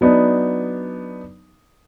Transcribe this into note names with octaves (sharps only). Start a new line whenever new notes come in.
F#3 B3 D4 D#4